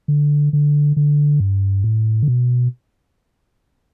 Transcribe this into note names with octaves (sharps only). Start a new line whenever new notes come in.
D3
D3
D3
G2
A2
D3
B2